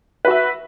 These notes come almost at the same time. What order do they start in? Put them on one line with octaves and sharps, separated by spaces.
B4 F#4 E5